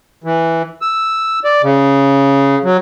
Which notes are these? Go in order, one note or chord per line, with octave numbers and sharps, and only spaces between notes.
E3
E6
D5
C#3
F#3